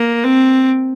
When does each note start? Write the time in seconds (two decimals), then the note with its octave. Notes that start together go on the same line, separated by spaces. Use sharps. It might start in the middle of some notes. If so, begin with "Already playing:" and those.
Already playing: A#3
0.24 C4